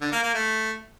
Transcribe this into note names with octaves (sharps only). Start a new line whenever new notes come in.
D3
A#3
A#3
A3